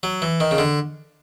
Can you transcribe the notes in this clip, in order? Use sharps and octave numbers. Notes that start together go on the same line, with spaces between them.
F#3
E3
D#3
C#3
D3